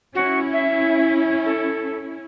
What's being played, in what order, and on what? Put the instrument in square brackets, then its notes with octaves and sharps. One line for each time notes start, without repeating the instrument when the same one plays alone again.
[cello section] C#4 E4 [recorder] F#4
[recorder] E5
A4